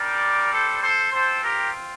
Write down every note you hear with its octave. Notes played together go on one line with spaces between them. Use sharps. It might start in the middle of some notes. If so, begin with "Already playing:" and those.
Already playing: G3 D4 G4 A#4 D5
A4 C5
A4 C5
C4 F4 A4 C5
G4 A#4